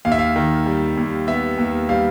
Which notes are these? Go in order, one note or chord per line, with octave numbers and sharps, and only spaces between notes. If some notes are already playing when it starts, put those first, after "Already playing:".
D#2 F5
E5
F5
D#3
G3
D#2
B3 E5
D#2
G3 F5